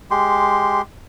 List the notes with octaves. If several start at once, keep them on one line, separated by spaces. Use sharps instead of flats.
G#3 G4 C6